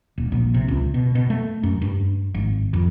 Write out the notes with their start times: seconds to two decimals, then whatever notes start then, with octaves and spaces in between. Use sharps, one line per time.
0.18 D#1
0.32 A#1
0.54 C3
0.68 C#2
0.94 B2
1.15 B2
1.30 A3
1.63 F#2
1.82 G2
2.34 G#1
2.73 F2